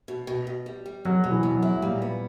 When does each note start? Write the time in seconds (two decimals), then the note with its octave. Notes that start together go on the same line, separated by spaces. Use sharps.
0.08 B2
0.27 B2
0.47 B2
0.66 G3
0.86 G3
1.05 B2 F#3
1.24 B2
1.31 E3
1.43 B2
1.57 F#3
1.63 E4
1.82 A#2 G3
2.02 B3